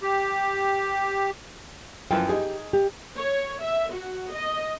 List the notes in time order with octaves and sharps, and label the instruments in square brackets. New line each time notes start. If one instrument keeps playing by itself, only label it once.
[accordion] G4
[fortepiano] F#2 E3 F3 [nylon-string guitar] G5
[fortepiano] D#4 G#4 [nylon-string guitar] G4
[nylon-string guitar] G4
[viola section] C#5
E5
F#4
D#5